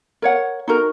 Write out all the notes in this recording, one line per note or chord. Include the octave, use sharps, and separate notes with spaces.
A#4 C#5 F#5
D#4 F#4 A#4